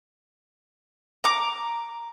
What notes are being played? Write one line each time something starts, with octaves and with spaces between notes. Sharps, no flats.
A#5 D6